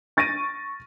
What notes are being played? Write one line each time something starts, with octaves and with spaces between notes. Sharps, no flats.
C#6 A6 A#6 D7 D#7